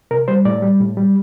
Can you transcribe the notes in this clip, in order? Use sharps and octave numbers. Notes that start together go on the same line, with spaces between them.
C3 A#4
G3 C5
A2 D5
G3
A2
G3